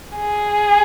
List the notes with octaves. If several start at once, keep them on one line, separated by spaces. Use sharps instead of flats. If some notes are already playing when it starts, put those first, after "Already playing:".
G#4